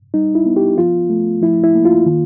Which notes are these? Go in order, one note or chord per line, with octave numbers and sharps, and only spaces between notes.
G3 D#4
E4
B3
G4
F3 F4
A3
F3 E4
E4
A#3
F4
D#3